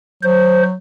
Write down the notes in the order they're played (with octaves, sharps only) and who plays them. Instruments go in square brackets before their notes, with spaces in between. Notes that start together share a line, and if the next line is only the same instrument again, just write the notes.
[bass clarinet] F#3 [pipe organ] C5